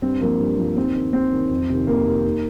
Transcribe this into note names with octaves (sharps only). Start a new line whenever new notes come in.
G2 C4
F3 A#3
G2
F3
D#2 C4
D#3
D#2 C4
D#3
F2
C3 D#3
F2 A#3
C3 D#3
D#2